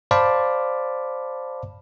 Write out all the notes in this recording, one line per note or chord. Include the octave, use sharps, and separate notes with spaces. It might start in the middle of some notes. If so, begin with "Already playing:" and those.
C5 D5 F5 A5 B5 D6